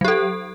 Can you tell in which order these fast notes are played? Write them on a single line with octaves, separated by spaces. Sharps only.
F#3 G4 A4